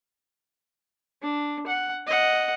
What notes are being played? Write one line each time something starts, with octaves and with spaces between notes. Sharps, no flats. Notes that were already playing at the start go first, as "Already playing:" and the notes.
D4
F#5
D#5 F#5